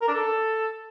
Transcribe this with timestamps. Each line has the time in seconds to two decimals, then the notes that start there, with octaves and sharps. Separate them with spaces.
0.02 A#4
0.08 D4
0.14 A4